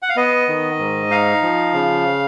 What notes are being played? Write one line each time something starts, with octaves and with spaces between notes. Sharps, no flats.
F#5
F5
B3 D#5
D#3
G#2
D#4 F5
F3
C#3